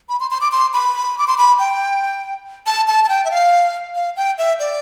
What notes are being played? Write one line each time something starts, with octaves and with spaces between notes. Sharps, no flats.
B5
C6
C6
D6
C6
B5
D6
C6
B5
G5
A5
A5
A5
G5
E5
F5
F5
G5
E5
D5